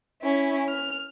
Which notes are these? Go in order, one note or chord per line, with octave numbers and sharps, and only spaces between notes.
C#4 E4
F6